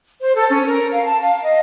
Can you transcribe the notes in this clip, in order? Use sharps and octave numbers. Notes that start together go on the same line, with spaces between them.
C5
A4
C#4
A#4
F5
A5
F5
D#5